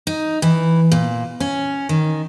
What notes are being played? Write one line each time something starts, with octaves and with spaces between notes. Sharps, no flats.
D#4
E3
A#2
C#4
D#3